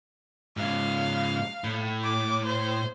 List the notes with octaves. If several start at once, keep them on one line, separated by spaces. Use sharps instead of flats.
G#2 C#3 F5
A2
D6
C5